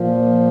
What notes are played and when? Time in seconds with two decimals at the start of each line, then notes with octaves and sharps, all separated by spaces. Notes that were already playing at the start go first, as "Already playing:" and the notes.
Already playing: A#2 F3